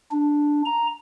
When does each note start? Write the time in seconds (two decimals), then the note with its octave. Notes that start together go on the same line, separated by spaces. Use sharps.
0.12 D4
0.65 A#5